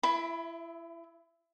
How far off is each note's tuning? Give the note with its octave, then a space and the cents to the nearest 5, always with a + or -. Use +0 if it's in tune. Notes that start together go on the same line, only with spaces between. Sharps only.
E4 +30 E5 -5 B5 +0